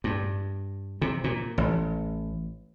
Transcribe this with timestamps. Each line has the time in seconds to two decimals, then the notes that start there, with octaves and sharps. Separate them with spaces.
0.04 G2
1.02 C3
1.24 A#2
1.58 A1